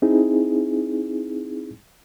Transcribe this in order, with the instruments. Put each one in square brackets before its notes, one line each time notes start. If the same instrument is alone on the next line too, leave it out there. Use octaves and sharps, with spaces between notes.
[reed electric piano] C4 D#4 E4 G#4